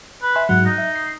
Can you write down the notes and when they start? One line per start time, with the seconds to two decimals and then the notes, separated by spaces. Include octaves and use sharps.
0.23 B4
0.35 E5 G#5 C6
0.49 G#2 F#3 F#5
0.66 D#4
0.78 E5
0.96 C7